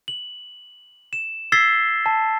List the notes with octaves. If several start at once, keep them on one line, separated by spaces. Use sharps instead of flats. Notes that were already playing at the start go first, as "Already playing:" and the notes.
F#7
E7
E6 G#6 A6 B6 C7 G7
A5